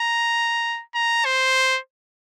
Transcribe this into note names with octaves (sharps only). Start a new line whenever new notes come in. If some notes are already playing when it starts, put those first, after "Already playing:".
Already playing: A#5
A#5
C5